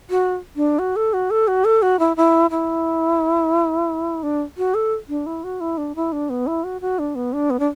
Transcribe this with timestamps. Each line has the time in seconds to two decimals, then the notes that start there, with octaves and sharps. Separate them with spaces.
0.10 F#4
0.56 D4
0.79 F#4
0.96 A4
1.13 F#4
1.31 A4
1.48 F#4
1.65 A4
1.82 F#4
1.99 E4
2.17 E4
2.51 E4
4.23 D4
4.58 F#4
4.75 A4
5.09 D4
5.26 E4
5.44 F#4
5.61 E4
5.78 D4
5.96 E4
6.12 D4
6.30 B3
6.47 E4
6.64 F#4
6.81 F#4
6.99 D4
7.15 B3
7.33 D4
7.50 B3
7.59 D4